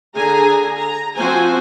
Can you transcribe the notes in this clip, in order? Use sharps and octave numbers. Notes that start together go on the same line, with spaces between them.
D3 G#4 G#5 A#5
A#5
F3 C4 F#4 C5 G#5